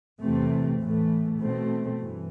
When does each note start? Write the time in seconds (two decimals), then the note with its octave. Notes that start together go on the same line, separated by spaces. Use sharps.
0.22 E2 C3 E3 A3 C4
0.81 A2 E3 A3
1.40 B2 A3 C4
1.99 G2 E3